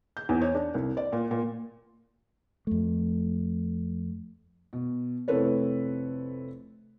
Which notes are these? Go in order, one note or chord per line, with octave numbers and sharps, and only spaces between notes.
G6
E2
C#5
D4
C2
D5
A#2
A#2
F2 A3
B2
F1 C4 E4 A4 B4 C#5